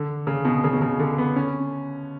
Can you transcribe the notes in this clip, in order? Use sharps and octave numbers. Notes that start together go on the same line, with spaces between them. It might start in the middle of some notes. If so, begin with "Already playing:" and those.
Already playing: D3
C#3
B2
C#3
B2
C#3
D3
B3
C#4